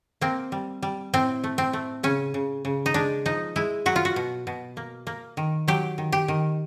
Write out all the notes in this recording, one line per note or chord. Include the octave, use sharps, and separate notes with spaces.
A#3 C4
G3
G3
A2 C4
A3
C4
A3
C#3 C#4
C#3
C#3
D#4
G#3 D4
F3 D#4
G#3 E4
F#3 F#4
F4
F#4
B2
B2
A#3
A#3
D#3
F#3 G4
D#3
G4
D#3